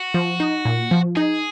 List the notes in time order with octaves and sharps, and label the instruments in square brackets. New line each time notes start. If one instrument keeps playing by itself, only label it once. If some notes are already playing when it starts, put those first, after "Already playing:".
Already playing: [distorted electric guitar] F#4
[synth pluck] F3
D#4
A#2
F3
[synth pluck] D#4 [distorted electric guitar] G#4